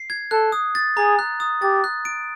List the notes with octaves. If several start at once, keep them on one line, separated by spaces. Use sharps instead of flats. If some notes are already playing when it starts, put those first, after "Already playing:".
Already playing: C7
G#6
A4 F#6
D#6
A6
G#4 A#5
F#6
D#6
G4 A6
F#6
D7